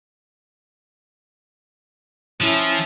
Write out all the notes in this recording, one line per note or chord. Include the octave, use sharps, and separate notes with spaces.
F3 C#4 E4